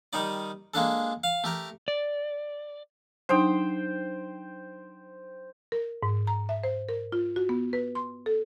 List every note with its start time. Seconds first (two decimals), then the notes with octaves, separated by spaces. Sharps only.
0.13 D#3 G3 D#4 D5
0.74 G#3 A#3 D4 A4
1.24 F5
1.44 A3 G4 A#4
1.88 D5
3.29 F#3 D4 D#4 C5 G5
5.72 A#4
6.03 G#2
6.27 A#5
6.49 E5
6.64 C5
6.89 A#4
7.12 F4
7.36 F#4
7.49 B3
7.73 B4
7.95 C6
8.26 A4